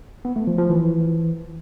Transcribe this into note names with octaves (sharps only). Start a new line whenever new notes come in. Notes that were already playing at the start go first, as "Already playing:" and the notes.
B3
A3
F3
F3
E3